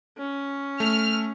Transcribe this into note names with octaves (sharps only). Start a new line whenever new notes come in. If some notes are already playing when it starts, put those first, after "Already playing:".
C#4
A3 F6